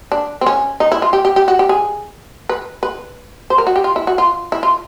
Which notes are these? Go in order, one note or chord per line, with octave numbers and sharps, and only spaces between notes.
D4
C4
C#4
D#4
E4
F4
G4
G4
G4
F#4
G4
G#4
B4
B4
C5
A#4
F#4
G4
F4
E4
F#4
F4
E4
F4